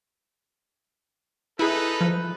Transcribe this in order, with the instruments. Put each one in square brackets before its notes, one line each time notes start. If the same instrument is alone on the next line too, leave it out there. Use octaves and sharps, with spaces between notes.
[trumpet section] D#4 A4 B4 [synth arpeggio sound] E4 G#4
[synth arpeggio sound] F3